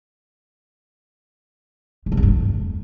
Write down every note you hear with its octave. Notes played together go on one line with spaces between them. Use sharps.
E2
C3
F2
G2
F2